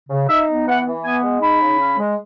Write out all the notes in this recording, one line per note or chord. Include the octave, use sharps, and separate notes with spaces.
C#3
D#4 E5
B3
E3 F#5
E3
B3 G#5
G#3
D#4 B5
C#3
C#4
G#3